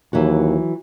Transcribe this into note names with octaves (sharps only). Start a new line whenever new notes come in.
D#2 E3 F#3 F#4